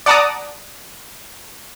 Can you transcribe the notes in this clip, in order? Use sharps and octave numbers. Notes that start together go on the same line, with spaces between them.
D5 F#5 A5 A#5 D6 D#6